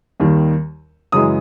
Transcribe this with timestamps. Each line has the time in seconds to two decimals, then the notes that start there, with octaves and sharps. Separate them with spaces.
0.20 D#2 D#3 G3
1.12 F#2 C#3 E3 G#3 D#6